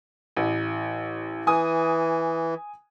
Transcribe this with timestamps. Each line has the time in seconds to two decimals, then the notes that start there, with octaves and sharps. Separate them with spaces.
0.36 A1
1.47 E3 G#5 D#6